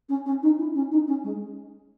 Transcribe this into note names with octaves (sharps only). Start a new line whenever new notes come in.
C#4
C#4
D#4
E4
C#4
D#4
C#4
G#3